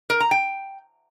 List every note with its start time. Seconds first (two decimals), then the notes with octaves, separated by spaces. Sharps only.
0.10 A#4
0.20 A#5
0.31 G5